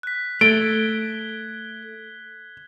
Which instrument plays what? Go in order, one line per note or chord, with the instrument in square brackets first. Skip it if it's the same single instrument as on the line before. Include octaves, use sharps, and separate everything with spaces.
[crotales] F#6 B6
[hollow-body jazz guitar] A3 [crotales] G#6 G7 [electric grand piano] D7